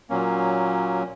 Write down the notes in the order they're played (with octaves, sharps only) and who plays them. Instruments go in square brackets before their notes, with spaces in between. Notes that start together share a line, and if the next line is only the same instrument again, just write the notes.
[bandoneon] A#2 F#3 A#3 C#4